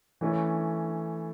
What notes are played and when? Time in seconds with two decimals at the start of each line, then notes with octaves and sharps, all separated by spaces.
0.21 E3 A3 C#4